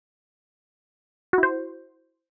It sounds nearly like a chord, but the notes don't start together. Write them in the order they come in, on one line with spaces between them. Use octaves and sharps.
F#4 E4 C5